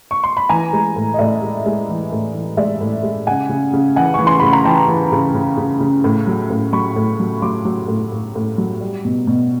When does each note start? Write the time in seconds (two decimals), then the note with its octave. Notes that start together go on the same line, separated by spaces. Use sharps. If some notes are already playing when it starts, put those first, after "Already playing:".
0.11 C#6
0.24 C6
0.37 B5
0.49 E3 G#5 A#5
0.73 G#3
0.96 A2
1.14 D#5
1.19 A2 D5 E5
1.42 G#3
1.66 G#3
1.89 E3
2.12 A2
2.35 E3
2.57 G#3 D5 E5
2.81 A2
3.03 G#3
3.27 C#3 F#5 G#5
3.50 C#3
3.73 C#3
3.96 E3 F#5 G#5
4.14 E3 C#6
4.27 C6
4.40 C#3 B5
4.53 A#5
4.65 E3 G5 A5
4.88 E3
5.12 C#3
5.34 C#3
5.57 C#3
5.81 C#3
6.04 A2
6.27 F#3
6.50 A2
6.73 F#3 B5 C#6
6.96 A2
7.20 F#3
7.42 F#3 C6 D6
7.65 F#3
7.88 A2
8.12 A2
8.36 A2
8.58 F#3
8.81 G3
9.05 B2
9.27 B2